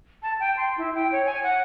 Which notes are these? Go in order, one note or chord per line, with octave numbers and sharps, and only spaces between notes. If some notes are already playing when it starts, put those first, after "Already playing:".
A5
G5
C6
E4
G5
C#5
G#5
F#5